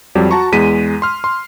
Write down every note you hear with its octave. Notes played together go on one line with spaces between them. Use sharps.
F2 F#3 G3
F#4 A5 A#5 C#6
E2 G#3 B6 D#7
C6 F6
C6